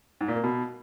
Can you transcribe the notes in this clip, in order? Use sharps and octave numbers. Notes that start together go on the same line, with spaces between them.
G#2
A#2
A#3
B2